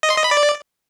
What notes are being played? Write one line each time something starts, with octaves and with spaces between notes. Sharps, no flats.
D#5
C6
D#5
B5
D5